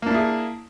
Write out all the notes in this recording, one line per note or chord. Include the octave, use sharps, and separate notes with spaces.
A#3 D4 E4 G#4